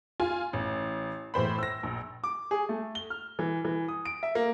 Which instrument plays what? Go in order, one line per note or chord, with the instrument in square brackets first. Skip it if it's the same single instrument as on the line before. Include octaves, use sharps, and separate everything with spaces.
[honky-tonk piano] F4 G#5
A1
A2 E3 C5 B5
E6 A#6
A#1
[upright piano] D6
G#4
A3
G7
F6
E3
E3
D#6
D7
E5
A#3